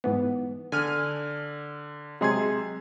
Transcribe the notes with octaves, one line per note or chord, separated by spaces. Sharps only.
G#2 E3 B3
D3 G#5 F6
C3 F#3 G#3 G#4 C6 G#6